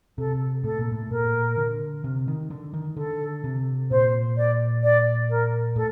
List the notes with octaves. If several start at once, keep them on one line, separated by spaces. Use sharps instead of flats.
C3 A4
A2 A4
A#2
A2
A#2 A#4
D3
C3
D#3
D3
D#3
D3 A4
C3
A#2 C5
D5
D5
A#4
A2 A4